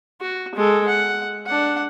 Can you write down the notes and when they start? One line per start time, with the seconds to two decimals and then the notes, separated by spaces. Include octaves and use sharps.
0.21 F#4
0.55 G#3 A4
0.87 F#5
1.46 D4 F#5